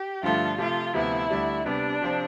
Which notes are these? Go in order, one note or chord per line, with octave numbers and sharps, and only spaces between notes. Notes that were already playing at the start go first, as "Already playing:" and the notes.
Already playing: G4
G2 D3 F3 A3 F4
C3 F3 A3 F4
D2 C3 F3 B3 E4
D2 D3 G3 D4
C3 G3 B3 D4
C3 F3 C4